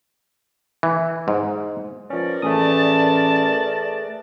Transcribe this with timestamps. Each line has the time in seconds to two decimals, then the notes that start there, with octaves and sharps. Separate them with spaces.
0.83 E3
1.28 G#2
2.10 F3 C#4 A#4 B4 D5
2.42 A1 A3 G#4 A5 D#6